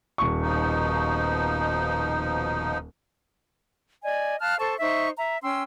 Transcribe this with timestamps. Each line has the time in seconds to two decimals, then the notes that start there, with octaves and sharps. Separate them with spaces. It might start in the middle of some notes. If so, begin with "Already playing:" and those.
0.18 D#1 C#6
0.42 B2 F3 D#4
4.04 D5 D#5 G#5
4.40 F5 A5 F6 F#6
4.59 A4 C5 A5 C#6
4.80 D#4 C5 E5 C#6
5.17 E5 A#5
5.43 C#4 G5 C6 E6